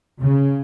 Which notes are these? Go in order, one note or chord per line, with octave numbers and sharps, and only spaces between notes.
C#3